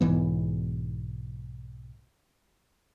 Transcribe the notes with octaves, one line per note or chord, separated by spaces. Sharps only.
B1 G#2 E3 B3